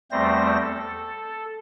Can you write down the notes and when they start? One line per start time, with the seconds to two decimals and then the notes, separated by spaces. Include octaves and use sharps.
0.11 E2 G3 A3 C4 C5 A#6
0.61 A4